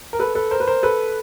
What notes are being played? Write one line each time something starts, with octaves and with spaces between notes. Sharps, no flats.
A#4
A4 B4
A4 B4
A#4 C5
B4
A#4 C5
A4 B4